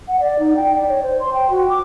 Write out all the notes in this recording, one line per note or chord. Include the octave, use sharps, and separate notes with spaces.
F#5
D5
D#4
G5
D5
C#5
C5
C6
G5
F#4
D6